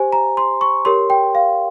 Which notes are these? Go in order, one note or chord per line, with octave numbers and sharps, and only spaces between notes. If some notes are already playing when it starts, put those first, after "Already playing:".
Already playing: G4 C5 G#5
A#5
C6
C#6
G4 A#4 C#5 C6
G5
F5